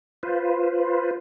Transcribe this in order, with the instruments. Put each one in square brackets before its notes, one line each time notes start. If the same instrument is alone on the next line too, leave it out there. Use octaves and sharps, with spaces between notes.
[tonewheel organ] F4 B4 C5